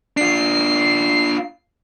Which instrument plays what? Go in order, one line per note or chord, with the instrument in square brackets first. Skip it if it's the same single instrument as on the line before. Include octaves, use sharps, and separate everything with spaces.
[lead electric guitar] D4 F4 [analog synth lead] C7